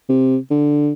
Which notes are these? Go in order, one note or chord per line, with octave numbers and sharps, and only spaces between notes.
C3
D3